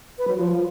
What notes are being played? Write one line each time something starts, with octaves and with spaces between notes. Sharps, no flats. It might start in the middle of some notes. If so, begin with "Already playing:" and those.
B4
F#3
F3